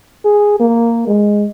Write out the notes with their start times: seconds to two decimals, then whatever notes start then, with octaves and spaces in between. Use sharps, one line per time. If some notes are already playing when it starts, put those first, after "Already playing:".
0.25 G#4
0.60 A#3
1.07 G#3